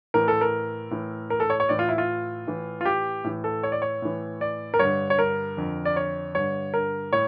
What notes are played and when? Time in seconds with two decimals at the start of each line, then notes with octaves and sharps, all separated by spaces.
0.14 A2 E3 A#4
0.28 A4
0.41 A#4
0.91 A2 E3
1.30 A#4
1.40 A4
1.50 C#5
1.60 C#5
1.69 A2 E3 D5
1.79 F4
1.89 E4
1.98 F4
2.47 A2 E3
2.81 F4
2.85 G4
3.24 A2 E3
3.44 A4
3.63 C#5
3.72 D5
3.82 C#5
4.02 A2 E3
4.41 D5
4.74 A#4
4.79 G2 D3 C#5
5.10 C#5
5.19 A#4
5.57 F2 D3
5.85 D5
5.96 C#5
6.35 G2 D3 C#5
6.74 A#4
7.12 A2 C#5